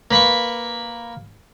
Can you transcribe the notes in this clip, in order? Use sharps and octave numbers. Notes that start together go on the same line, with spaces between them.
A#3 B4 B5 C#6